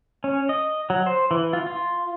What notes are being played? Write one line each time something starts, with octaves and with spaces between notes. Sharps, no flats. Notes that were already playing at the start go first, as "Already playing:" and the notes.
C#4
D#5
F#3
C5
E3
F4
F4